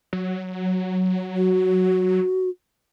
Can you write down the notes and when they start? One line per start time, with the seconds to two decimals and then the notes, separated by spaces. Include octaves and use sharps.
0.13 F#3
1.36 F#4